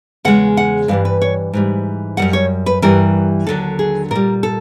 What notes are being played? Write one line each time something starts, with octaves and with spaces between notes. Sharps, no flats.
E2 C#3 G#3 F#5
F#5
G2 E3 G3 F5
B4
C#5
G#2 E3 G3
F#2 D#3 G3 F#5
C#5
B4
G2 E3 G3 A#4
D#2 D3 F#3 A4
G#4
A#2 G3 A#4
A4